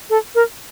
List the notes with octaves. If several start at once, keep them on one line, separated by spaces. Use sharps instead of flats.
A4
A#4